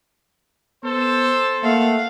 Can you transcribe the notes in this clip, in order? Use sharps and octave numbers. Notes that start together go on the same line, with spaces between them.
B3 A4 C5
A3 A#3 F5 F#5